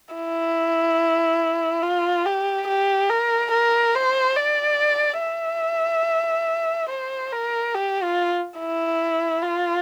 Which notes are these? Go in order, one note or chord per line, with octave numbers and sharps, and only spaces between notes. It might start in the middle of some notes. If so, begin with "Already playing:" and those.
E4
F4
G4
G4
A#4
A#4
C5
D5
E5
C5
A#4
G4
F4
E4
F4